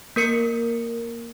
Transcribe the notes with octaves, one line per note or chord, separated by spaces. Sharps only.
A#3 A#4 C#7